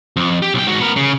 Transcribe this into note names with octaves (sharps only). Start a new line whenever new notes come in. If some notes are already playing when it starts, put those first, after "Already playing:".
F2
G4
B1 G5
G#2 F#4
B3 A#4
C#3